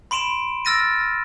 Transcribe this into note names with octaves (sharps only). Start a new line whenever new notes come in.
B5 C6 D7 E7 F7
E6 F6 A6 A#6 D7 D#7